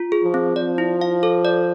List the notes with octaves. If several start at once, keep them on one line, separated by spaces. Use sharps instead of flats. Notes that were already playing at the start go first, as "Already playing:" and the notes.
Already playing: F4
G#4
F3
C4
F3 D5
E4
F5
A4
D5